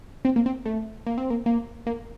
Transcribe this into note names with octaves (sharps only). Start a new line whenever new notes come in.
C4
A#3
C4
A3
A#3
C4
A#3
A#3
A#3